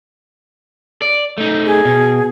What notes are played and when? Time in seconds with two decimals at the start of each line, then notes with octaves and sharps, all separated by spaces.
1.02 D5
1.38 A3 D#4
1.66 G#4
1.85 B2